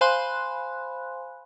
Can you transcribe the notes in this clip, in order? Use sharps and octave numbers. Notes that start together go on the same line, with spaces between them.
C5 F5 G#5 B5 C6 F#6